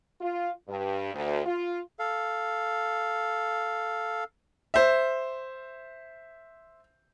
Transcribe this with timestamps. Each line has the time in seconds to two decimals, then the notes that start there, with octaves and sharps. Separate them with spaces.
0.21 F4
0.69 G2
1.14 D2
1.46 F4
1.99 A4 F5
4.74 C5 E5